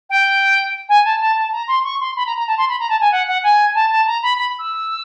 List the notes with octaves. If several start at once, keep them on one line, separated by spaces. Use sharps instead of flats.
G5
G#5
A5
A5
A5
A#5
C6
C#6
C6
B5
A#5
A#5
A5
C6
B5
A#5
A5
G#5
F#5
F#5
G#5
A5
A5
A#5
B5
B5
E6